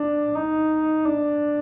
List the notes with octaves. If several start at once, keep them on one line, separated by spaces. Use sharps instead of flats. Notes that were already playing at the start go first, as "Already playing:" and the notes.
Already playing: D4
D#4
D4